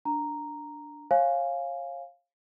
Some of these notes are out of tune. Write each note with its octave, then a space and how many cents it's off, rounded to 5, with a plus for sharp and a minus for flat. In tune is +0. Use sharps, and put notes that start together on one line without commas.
D4 +0 A#5 +0
C#5 -35 F5 +0 G#5 +0